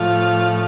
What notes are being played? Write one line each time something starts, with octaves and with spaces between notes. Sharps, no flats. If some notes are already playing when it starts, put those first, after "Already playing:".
Already playing: A2 F3 F4